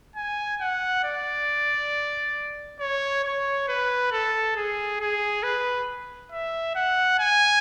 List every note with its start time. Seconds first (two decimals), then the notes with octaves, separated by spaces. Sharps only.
0.16 G#5
0.61 F#5
1.05 D5
2.80 C#5
3.24 C#5
3.68 B4
4.12 A4
4.56 G#4
5.00 G#4
5.43 B4
6.32 E5
6.75 F#5
7.19 G#5